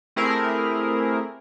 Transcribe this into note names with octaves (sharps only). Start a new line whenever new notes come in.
A3 C4 E4 G4 G#4 A#4